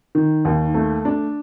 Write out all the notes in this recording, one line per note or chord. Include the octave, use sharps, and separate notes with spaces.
D#3
D#2
A3
D4